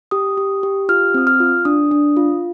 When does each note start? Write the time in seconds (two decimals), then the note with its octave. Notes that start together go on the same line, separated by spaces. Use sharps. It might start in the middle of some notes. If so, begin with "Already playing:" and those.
0.11 G4 D#6
0.37 G4
0.63 G4
0.89 F4 F6
1.14 C4 D#6
1.27 F6
1.40 F4
1.65 D4 D#6
1.91 D4
2.17 F4